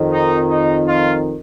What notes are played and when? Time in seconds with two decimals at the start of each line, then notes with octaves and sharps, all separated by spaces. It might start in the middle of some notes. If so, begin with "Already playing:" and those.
Already playing: F2 D#3
0.12 D#4
0.49 D#4
0.86 F4